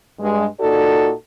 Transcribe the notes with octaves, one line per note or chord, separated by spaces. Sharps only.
G2 G#3
A#2 D#4 F#4 A4 D5